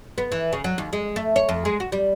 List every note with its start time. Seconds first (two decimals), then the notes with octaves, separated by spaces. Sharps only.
0.18 B3
0.32 E3
0.53 C#3
0.64 F#3
0.78 D#2
0.93 G#3
1.16 A3
1.36 C#5
1.49 F2
1.65 G#3
1.80 F#4
1.92 G3